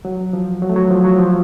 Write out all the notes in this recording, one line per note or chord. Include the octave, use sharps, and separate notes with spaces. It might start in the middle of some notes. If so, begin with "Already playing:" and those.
F#3
F3
F#3
A3
F#3
F3
F#3
F3